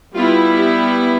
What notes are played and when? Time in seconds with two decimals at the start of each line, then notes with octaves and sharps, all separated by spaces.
0.15 G3 B3 E4 F4
0.55 G4